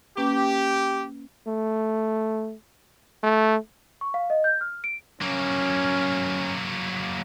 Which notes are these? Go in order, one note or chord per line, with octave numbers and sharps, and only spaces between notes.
A#3 C#4 G4 B4
A3
A3
C#6
F5
D#5
G6
F6
D7
F#3 A#3 C#4